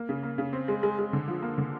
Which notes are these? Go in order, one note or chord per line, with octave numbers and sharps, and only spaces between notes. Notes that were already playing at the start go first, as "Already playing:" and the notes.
Already playing: A#3
C#3
A#3
C#3
C4
G#3
G#3
G#3
D3
F3
A#3
D3